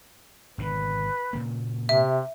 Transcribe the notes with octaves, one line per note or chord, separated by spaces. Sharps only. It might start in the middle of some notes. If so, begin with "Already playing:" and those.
G#1 B2 D3 B4
A#2 C#3 A#3
C3 E5